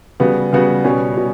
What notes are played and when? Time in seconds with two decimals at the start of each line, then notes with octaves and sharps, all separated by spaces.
0.20 C#3 G3 B3 F#4
0.53 C#3 G3 B3 F#4
0.84 B2 G3 C#4
1.17 B2